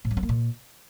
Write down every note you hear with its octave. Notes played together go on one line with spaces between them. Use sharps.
A2
F#3
C#4
A#3
A#2